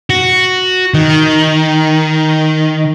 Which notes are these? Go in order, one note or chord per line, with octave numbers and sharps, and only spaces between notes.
F#4
D#3